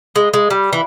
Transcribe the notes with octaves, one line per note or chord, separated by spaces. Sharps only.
G#3
G#3
G3
E3